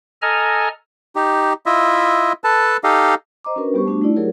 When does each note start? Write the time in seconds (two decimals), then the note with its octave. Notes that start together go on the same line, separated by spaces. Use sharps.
0.22 A4 D#5 G#5 A#5 F6
1.16 D#4 G4
1.66 E4 F4 D#5 E5
2.44 A4 B4 A5
2.84 D#4 G4 A4 D#5 F5
3.44 C5 D#5 A#5 D6
3.56 C#4 D4 F#4 A#4 B4
3.74 G3 B3 G4 C5 C#6
3.86 A3 D4 F#4
4.01 A3 D#4 E4 D5
4.16 F#3 F4 G4 G#4 A#4 C#5